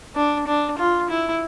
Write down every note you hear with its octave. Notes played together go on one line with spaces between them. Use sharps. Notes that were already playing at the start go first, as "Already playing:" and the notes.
D4
D4
F4
E4